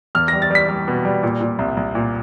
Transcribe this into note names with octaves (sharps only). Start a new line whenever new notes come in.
E2 F6
A#6
G3
A6
G3 B6
G3
B2
G3
A#2
A#2
C2
C2
A#2